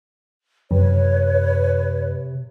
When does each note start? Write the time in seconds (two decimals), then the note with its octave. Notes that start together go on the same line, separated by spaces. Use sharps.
0.71 F#2 C3 B4 C#5